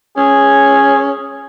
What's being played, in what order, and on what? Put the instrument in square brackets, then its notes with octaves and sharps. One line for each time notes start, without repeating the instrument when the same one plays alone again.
[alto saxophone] C#4 [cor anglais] G#4